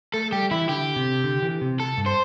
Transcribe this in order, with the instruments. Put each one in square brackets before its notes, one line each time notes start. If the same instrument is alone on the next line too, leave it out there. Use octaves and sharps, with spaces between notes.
[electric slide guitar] A3 [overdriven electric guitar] A4
[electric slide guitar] G3 [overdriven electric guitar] G4
[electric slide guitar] E3 [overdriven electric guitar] E4
[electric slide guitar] D3 [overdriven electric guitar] G4
[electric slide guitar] C3
D3
E3
C3
[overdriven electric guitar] A4
[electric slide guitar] G2
[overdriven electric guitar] C5